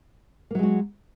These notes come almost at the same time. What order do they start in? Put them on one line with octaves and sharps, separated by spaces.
A#3 F#3 G#3 F#4